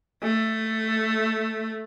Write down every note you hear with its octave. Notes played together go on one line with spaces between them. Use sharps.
A3